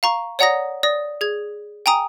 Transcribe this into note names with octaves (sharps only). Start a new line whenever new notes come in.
F5 A#5 C#6
C#5 D5 F#5 A#5 D#6 A#6
D5 D#6 A#6
G#4 G#6
G5 G#5 A#5 D#6